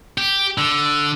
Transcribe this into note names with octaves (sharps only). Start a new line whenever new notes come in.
G4
D3